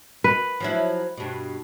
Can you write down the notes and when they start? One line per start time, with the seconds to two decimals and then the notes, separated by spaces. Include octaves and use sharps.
0.24 B4
0.60 F3 F#3 E4
1.17 G2 B2